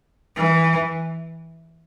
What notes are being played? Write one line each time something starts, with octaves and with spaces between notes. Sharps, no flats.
E3